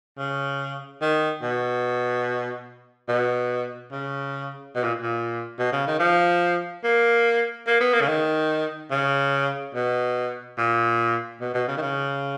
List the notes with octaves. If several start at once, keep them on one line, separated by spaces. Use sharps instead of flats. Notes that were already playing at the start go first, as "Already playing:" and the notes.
C#3
D#3
B2
B2
C#3
B2
A#2
A#2
B2
C#3
D#3
F3
A#3
A#3
B3
A#3
C#3
D#3
C#3
B2
A#2
B2
B2
C#3
D#3
C#3